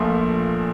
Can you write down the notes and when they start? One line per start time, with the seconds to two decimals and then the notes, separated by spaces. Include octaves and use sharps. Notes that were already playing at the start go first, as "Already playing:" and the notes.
Already playing: A#1 A#2 F3 A3